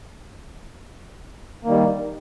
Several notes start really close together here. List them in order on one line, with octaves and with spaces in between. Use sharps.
A#3 D#3 G3